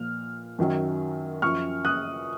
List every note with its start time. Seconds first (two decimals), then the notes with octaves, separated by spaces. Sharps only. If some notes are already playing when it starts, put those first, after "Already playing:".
Already playing: A#2 F3 F6
0.59 F#2 D#3 F#3
1.42 F#2 F3 C#6 F6
1.85 D#6 F#6